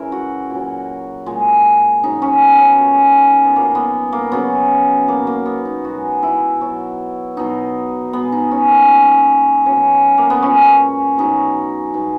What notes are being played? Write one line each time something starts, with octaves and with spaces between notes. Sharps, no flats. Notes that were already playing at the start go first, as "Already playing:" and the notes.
Already playing: C#3 E3 G#3 E4 A#4
F#4
A#2 F#3
A#2 G#3
C#3 F#3 D#4
C#4
B3
C#4
A#2 G#3
B3
A#2 F#3 A#3
B3
A#3
C#3 F#3 B3
B2 F#3 A#3
A#3
B3
D#4
B2 G#3 F#4
E4
B2 F#3
B2 F#3 D#4
B2 G#3 B3
D#4
C#4
A#3
A#2 G#3
B2 F#3 C#4
A#3
B3
A#2 G#3 C#4
B2 F#3 D#4
B2 G#3 D#4